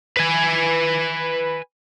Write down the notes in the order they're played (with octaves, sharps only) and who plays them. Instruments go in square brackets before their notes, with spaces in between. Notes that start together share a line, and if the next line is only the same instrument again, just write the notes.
[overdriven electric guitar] B4 G#5